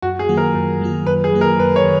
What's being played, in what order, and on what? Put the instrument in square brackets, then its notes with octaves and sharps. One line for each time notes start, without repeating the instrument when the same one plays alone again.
[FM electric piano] F#2 [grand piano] F#4
[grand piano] G#4
[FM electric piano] D#3 F#3 A#3 F4
[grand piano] A#4
[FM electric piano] F#2
D#3 F#3 A#3 F4
[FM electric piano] F#2 [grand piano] B4
[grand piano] G#4
[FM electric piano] D#3 F#3 A#3 F4
[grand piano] A#4
[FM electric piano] F#2 [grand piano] B4
[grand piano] C#5
[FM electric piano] D#3